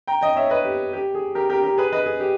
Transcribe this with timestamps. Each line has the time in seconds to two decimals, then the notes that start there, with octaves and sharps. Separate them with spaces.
0.07 G5 A#5
0.21 D#5 G5
0.36 C#5 E5
0.50 B4 D#5
0.65 G4
0.93 G4
1.14 G#4
1.35 G4 A#4
1.49 G4 A#4
1.63 G4 A#4
1.78 G#4 B4
1.93 B4 D#5
2.06 G#4
2.20 G4